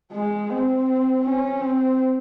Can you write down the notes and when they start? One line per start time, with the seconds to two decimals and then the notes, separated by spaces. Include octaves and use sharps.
0.12 G#3
0.50 C4
1.24 C#4
1.61 C4